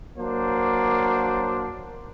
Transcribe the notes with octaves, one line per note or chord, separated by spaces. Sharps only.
F#3 A#3 D4 C5